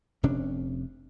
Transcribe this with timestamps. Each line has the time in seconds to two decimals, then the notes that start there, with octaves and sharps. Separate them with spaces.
0.23 F1 C3 C#4 D4